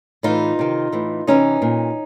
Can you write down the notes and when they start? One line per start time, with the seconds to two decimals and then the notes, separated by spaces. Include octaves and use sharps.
0.23 A2 E3 D#4 F4
0.59 C3 D#3
0.93 A2 E3
1.27 C3 E3 C#4 D#4
1.62 A#2